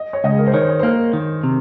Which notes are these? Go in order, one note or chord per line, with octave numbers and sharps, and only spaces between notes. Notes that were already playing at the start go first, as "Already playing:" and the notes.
Already playing: D#5
C#5
C#2 D#5
G#4
A#4
C5
D#3 C#5
C5
C#5
C5
A#3 A#4
D#3
C3